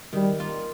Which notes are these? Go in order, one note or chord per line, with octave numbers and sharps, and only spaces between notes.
D#3 G3
A#3 F4